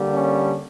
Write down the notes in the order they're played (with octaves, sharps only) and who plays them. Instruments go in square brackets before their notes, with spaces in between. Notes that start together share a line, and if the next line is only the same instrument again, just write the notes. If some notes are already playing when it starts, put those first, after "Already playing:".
Already playing: [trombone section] D3 G3 A#3
C#4